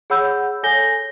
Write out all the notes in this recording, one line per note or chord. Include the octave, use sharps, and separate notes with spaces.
G#4 C#5 F#5 B5 E6 G6
A4 C#5 G#5 G6 A#6 G7